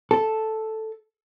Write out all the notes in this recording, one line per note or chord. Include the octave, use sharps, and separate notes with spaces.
A4